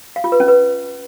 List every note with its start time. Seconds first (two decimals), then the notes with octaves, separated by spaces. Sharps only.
0.16 F5
0.24 F4
0.32 B4
0.40 C#4
0.48 B4